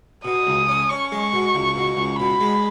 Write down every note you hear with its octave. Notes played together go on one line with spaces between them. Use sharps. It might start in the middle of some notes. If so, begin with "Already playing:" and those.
B2 D#6
C#2
C#4
C#4 C#6
G#3
C#6
B2
C#2
B2
C#2
B2 B5
G#3